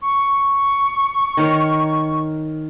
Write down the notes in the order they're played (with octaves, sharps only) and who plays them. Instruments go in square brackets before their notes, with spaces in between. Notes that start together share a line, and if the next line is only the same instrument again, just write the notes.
[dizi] C#6
[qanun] D#3 A#4 C#5